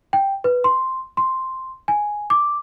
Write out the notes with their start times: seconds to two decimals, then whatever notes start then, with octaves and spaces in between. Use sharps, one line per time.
0.13 G5
0.44 B4
0.64 C6
1.17 C6
1.88 G#5
2.30 D6